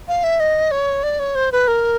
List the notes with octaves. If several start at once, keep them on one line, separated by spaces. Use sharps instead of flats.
F5
E5
D#5
C#5
D5
C#5
C5
B4
A#4